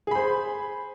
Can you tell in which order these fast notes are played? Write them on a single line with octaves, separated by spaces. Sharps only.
G#4 B5 C5